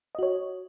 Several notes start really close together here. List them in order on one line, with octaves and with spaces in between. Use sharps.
D#5 F#4 C#5